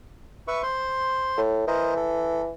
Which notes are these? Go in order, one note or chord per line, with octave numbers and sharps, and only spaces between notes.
B4 E5 C#6
C5 C6
A2
E3 A#4 C5 D#5
A4